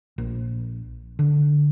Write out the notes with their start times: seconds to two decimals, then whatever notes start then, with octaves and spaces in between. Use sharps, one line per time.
0.18 A#1
1.19 D3